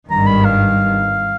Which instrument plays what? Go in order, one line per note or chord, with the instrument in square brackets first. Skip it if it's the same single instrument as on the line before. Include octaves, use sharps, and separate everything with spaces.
[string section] G#1 G2 D#3 [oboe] A#5
[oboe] B5
F5